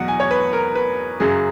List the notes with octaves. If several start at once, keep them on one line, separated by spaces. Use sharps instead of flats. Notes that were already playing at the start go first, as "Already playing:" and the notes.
Already playing: E2 B2 F#3 F#5
G#5
C#5
B4
A#4
B4
F#2 C#3 F#3 G#4